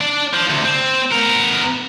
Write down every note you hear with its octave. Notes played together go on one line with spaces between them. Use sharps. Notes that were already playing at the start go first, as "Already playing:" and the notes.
D4 D5
F3
D2 C3
C4
B3 A#4